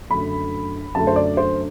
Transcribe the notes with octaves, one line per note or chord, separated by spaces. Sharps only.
F#2 D3 A3 B5
F#2 D3 A3 A5
C5
D5
C5